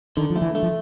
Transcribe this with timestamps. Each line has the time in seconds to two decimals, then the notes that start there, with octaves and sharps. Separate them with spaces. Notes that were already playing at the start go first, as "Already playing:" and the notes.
0.17 D3 D#3
0.30 F3
0.36 A3
0.42 E3
0.55 A3
0.63 F3